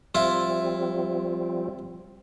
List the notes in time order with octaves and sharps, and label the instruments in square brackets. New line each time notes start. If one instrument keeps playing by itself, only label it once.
[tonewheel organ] F3 G3 C4 [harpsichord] E4 F4